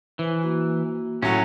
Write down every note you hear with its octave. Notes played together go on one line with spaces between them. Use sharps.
E3 C5 G#5
A#3 F#4
A2 F#3 C#4